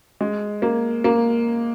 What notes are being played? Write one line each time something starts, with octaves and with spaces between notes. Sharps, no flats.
G#3
A#3
A#3